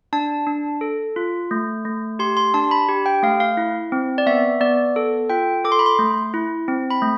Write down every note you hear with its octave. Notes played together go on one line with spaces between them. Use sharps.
D4 A5
D4
A4
F4
A3
A3
G4 C6
C6
D4 A5
B5
G4
G5
A3 F5
F5
E4
C4
D5
B3 E5
B3 D5
A4
F4 G5
A4 D6
C6
B5
C6
A3
E4
C4
B5
A3